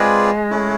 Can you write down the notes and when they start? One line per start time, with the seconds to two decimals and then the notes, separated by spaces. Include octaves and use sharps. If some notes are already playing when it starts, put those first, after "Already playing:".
Already playing: G#3 C4 F4 G#4 B4 D5
0.50 A3 C#4 E4